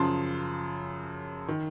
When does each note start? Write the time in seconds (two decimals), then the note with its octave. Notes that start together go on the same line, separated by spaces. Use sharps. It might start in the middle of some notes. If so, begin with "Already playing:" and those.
Already playing: F#2 C#3 F3 A5 C6
1.48 D#3